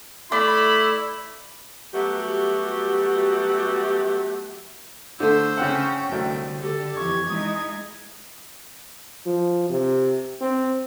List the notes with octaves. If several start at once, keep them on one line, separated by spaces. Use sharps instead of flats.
A3 E4 D5 B5
F#3 G3 A3 B3 F#4 G4
D3 A3 C5 E6
C#3 C#4 F#5 G5
C2 D3 F#3 A3
G4 A4
F2 E3 C#6 G#6
G#3 D#4 E4 D#6
F3
C3
C4